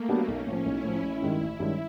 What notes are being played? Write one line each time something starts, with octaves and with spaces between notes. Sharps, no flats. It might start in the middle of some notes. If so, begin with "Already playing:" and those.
Already playing: A3 A#3
F#3 B3 D4 G4
B1 C#4
A2 F3
B1 E4
A2 F3
A1 E4
G2 D#3 G#3 C#4
A1
G2 D#3 G#3 C#4